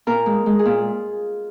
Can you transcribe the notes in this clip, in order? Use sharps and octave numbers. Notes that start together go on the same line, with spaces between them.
A#2 A#4
G#3
G#3
G#4
A#2